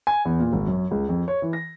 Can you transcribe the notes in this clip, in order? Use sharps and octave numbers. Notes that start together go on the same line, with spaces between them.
G#5
E2
A#2
G#1
F#2
C#2
F2
C#5
E3
A#6